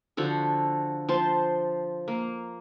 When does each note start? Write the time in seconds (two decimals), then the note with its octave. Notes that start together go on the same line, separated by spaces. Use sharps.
0.17 D3 F3 F#4 A4
1.09 F3 C5 A5
2.08 A#3